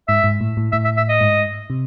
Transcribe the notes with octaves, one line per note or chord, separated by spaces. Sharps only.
G#2 E5
G#2
A2
A2
A2 E5
E5
E5
D#5
G#2
C3